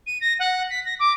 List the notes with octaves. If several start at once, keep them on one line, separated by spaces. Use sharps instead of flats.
D#7
A#6
F#5
B6
A#6
D6